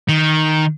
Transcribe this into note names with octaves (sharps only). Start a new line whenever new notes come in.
D#3